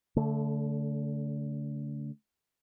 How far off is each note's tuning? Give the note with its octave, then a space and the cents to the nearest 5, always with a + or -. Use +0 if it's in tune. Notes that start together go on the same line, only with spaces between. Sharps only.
D3 -35 A3 +0